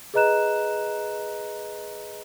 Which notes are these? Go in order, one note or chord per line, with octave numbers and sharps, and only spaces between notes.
G#4 B4 D#5 A#5 F#6 E7